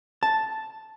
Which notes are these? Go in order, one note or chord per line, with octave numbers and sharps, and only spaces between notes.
A5